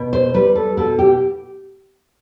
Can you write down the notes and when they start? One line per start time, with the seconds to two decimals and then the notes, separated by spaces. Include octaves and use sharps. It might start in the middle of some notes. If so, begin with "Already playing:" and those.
Already playing: B2
0.13 C5
0.34 G3 B4
0.56 A4
0.77 B2 A4
0.99 G4